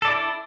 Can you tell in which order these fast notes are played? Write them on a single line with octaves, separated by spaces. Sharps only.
A4 D5 E4 D4